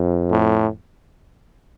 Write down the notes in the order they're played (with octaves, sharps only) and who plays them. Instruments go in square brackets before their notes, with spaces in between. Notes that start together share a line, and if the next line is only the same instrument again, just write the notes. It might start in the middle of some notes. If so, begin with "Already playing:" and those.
Already playing: [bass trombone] F2
[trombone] A2